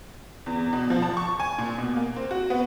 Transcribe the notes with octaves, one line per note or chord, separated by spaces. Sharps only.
E2
B2
F3
A5
C#6
G#5
A#2
B2
A#3
C4
F#4
B3